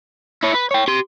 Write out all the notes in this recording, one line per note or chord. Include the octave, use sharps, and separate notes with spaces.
E4 C#5
B4
C#5 G5
G4 C6